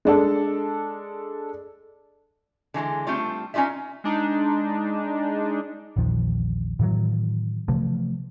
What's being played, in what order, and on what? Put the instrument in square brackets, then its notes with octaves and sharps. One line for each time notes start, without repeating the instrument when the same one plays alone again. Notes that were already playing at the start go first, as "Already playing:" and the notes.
[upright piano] G#3 D4 A4
[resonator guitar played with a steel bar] D3 E3 F#3 G#3
G3 A3 C4 D4 F4 D5
C#4 D#4 F4 D5 E5
[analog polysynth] G#3 D4 D#4
[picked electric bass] A#1 E2 D#3 F3
A2 D#3 E3 F#3
C3 E3 F3 A3